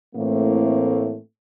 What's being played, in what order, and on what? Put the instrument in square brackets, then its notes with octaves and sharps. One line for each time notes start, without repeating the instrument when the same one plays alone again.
[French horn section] A2 E3 A3 A#3 C4